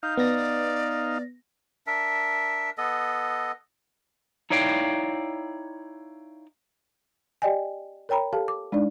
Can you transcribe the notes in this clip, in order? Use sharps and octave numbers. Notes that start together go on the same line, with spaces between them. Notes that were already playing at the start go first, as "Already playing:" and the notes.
D#4 F5 G6
B3 D5 A#6
D4 A#4 E5
B3 A4 D#5
D#4 E4 C#5 D5 F5 G5
G4 D5 D#5 G5 G#5
A#4 C#5 G5 A#5 B5
G4 A4 F5 A5
D6
G#3 D4 D#4 D5